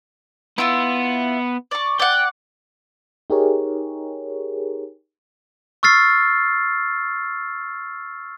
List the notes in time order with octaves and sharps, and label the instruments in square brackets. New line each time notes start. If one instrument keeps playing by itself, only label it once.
[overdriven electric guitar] B3 [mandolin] E4 F4
[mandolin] D5 C#6
[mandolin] D5 F#5 [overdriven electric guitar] G5
[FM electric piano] D#4 G4 G#4 A#4 C#5
[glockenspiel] C#6 E6 F6 A6 C7